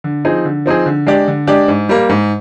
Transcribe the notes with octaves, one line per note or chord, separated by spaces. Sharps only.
D3
F3 C4 D#4 G#4
D3
F3 C4 D#4 G#4
D3
G#3 D4 G4 D5
D3
G#3 D4 G4 D5
G#2
G3 A#3
G#2